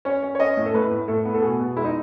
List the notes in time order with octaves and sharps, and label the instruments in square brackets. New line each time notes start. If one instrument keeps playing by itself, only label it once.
[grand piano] C#4 C#5
C#4
C#5
C#4 D#5
A2
A4
A2 B4
A2
A2 A4
B3
A4
B2 G#4
B2
G#3 E4
D#4